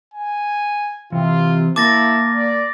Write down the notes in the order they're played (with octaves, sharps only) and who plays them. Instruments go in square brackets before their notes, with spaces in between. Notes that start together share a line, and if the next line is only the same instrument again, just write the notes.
[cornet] G#5
[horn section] C3 [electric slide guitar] E3 [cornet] F4
[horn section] A#3 [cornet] E4 [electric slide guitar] A5 [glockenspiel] D6 A6 A#6
[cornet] D5